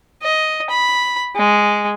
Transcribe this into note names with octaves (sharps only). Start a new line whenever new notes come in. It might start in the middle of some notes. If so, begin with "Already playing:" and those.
D#5
B5
G#3